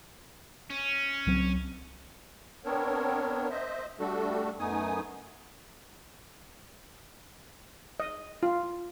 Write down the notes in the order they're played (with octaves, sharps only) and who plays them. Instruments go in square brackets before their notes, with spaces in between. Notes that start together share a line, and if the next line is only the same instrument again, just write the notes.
[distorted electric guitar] C#4
[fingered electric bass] C2 F#3 C4
[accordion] B3 C4 D4 A#4 C#5
C5 D#5 E5
G3 A3 D4 F#4 A4
F#2 A3 B3 D#4 G#5 D#6
[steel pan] D#5
F4